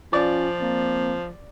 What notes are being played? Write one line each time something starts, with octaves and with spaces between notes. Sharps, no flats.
F3 C#4 F4 D5
A#3 C4